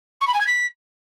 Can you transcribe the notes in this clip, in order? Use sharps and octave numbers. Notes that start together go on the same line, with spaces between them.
C#6
B5
G#5
G#6
B6